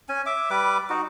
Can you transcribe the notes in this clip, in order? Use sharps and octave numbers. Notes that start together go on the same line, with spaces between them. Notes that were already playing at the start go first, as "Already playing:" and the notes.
C#4 G#5
E5 D6
G3 B4 D6
D#4 F#4